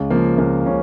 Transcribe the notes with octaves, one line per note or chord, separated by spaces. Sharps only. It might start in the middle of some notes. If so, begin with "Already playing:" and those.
Already playing: C#2
C#3 F3 A#3
C#2 A#3
C#3 C#4